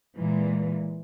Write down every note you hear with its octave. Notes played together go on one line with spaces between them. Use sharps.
A#2 E3 G#3